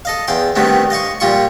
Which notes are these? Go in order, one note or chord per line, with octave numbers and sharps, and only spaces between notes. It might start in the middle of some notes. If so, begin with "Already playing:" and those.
A4 D#5 F5
E2 F5 G5 C6
D3 D#3 G3 A3 B3 C4
D#5 F5 C6 C#6
A#2 G3 F4 C6 C#6